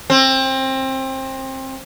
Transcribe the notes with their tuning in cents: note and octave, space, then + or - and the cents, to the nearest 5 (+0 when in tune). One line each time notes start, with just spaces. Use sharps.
C4 +25